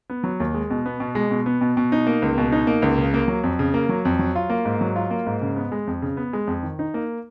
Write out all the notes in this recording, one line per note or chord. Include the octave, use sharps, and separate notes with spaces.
B3
F#3
D#2
G#3
B2
B3
B2
G#3
B2
B3
B2
B2
D#4
A#3
C#2
B2
D#4
A#3
C#2
C#3
A#3
F#3
F2
C#3
A#3
F#3
F2
F#3
F4
A#3
G#2
F#3
F4
A#3
G#2
C#3
B3
G#3
F2
C#3
B3
G#3
F2
D#3
D#4
A#3